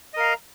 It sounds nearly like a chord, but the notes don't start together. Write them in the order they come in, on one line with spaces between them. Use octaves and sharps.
D#5 A#4 F5 A#5